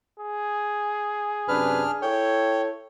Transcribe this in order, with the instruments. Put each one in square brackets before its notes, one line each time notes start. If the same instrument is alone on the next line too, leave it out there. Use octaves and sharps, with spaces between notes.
[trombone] G#4
[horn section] F#2 C3 B4 [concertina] D4 F6
[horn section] E4 A4 C#5 [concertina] G5